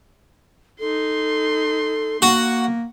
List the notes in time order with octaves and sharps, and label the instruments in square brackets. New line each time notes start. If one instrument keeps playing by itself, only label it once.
[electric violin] D#4 C6 [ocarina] A4
[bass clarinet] A#3 [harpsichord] F#4 [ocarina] F#5